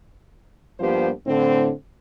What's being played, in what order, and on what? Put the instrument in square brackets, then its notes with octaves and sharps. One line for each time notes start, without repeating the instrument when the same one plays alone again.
[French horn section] G2 F3 A#3 B3 G4 C5
A2 D3 C4